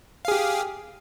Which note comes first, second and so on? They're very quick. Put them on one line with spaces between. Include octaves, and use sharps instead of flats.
F5 G#4 G4